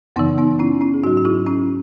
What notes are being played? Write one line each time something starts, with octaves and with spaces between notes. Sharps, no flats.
F#2 C#3 E3 B3 D#4
B3 D#4
C#4 E4
C#4 E4
G#4
G#2 F#3 D#4 F#4
F#4
E4 G#4
C#4 E4